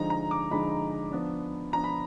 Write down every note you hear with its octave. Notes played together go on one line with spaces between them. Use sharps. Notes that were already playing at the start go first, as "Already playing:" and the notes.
Already playing: D3 F3 G#3 D#4 A#5
A#5
D6
D3 F3 G#3 D#4 B5
F3 B3 D4
F3 B3 D4 A#5
B5